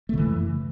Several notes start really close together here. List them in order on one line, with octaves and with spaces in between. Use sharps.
A3 C#3 E3 F#2